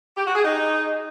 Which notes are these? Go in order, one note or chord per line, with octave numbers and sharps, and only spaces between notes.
G4
F#4
G#4
D#4